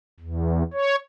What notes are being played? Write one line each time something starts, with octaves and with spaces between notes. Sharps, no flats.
E2
C#5